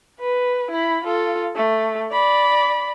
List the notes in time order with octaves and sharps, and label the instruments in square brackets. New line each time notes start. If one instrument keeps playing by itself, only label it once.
[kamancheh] B4
E4 B5
F4 A4
A3
D5 B5